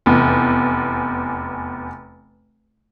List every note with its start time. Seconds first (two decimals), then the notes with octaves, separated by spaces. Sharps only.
0.06 F1 E2